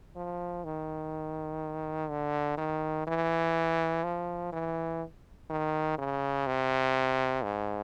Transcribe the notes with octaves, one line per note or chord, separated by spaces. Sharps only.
F3
D#3
D3
D#3
E3
F3
E3
D#3
C#3
C3
G#2